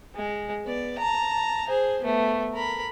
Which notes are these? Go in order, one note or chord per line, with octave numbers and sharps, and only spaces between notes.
G#3
B3 D5
A5 A#5
G#4 C5
A3 B3
A#4 B5